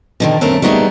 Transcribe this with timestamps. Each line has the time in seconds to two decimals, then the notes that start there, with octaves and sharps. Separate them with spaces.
0.20 B2 D3 D#3
0.41 F#2 A3 C4 A#4 A5
0.62 G3 A3 B3 D#4 F4 G#4